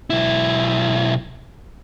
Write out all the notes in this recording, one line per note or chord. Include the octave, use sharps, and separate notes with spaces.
B1 E4